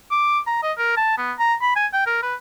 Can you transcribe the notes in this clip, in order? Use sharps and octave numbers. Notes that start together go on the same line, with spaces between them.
D6
A#5
D#5
A#4
A5
B3
A#5
B5
G#5
G5
A#4
B4